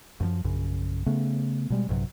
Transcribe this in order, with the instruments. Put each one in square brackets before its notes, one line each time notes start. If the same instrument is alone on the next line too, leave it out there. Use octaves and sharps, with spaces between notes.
[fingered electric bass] F#2 E3 F3
A#1 F#2 C#3
C#3 A3 B3
B2 G3 G#3
A#1 G2 C3 F#3